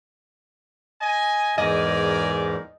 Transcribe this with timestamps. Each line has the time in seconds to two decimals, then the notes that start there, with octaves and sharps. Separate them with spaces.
1.01 D#5 G#5
1.58 E2 G#2 A#4 D5 D#5 G#5